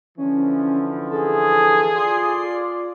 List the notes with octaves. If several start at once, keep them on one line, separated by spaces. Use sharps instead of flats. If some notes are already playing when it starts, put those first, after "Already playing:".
D3 E3 F3 C#4
G#4 A4
F4 D5 C6